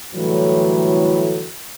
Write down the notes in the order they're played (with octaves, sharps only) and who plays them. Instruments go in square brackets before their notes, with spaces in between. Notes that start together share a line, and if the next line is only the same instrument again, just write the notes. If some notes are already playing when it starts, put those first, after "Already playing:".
[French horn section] A2 D3 E3 F#3 G3 A3